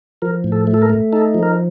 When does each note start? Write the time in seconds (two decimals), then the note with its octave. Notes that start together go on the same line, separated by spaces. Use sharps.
0.22 F3 A#4
0.44 A2
0.52 A4
0.67 A3
0.74 A4
0.82 A#4
0.90 A3
1.13 D#4 A4
1.34 F3
1.43 A#4